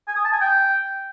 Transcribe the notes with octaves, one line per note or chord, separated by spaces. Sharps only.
G#5
D#6
A5
G#5
G5